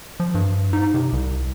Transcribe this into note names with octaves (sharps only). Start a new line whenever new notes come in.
F3
G2
D#4
C3
C2